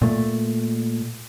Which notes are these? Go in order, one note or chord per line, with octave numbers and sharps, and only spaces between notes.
A#2 A3